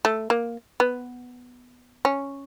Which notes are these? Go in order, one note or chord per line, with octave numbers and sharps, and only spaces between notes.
A3
A#3
B3
C#4